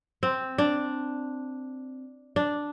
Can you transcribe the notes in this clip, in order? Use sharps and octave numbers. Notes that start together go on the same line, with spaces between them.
C4
D4
D4